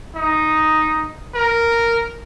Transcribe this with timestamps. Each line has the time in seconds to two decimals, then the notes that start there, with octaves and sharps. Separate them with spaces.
0.16 D#4
1.35 A#4